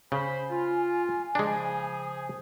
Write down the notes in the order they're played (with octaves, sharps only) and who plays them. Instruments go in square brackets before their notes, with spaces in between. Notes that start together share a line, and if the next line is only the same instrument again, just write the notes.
[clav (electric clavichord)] C#3 [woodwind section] C5 B5 [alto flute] G#5
[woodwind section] F4
[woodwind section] C#3 F3 G#4 [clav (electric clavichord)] G#3 D4